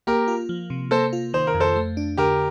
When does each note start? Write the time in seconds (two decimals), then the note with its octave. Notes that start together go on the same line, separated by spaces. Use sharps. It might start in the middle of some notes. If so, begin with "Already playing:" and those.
0.07 A#3 G4 A#4
0.28 F4
0.49 F3
0.70 C3
0.91 A#3 A4 C5
1.13 F4
1.34 D#3 C5
1.47 A#4
1.54 F2
1.60 A4 C5
1.76 A3
1.97 D4
2.17 D3 G4 A#4